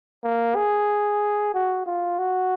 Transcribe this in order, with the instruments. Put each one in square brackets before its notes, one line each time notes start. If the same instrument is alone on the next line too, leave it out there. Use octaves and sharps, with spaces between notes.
[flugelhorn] A#3
G#4
F#4
F4
F#4